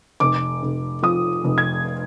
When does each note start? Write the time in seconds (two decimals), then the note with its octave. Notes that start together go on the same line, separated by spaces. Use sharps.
0.20 F1 D6
0.62 F1
1.03 F3 D#6
1.44 F1
1.58 G#6